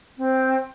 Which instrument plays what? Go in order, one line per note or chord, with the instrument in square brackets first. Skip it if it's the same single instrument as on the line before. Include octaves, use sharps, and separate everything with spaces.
[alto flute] C4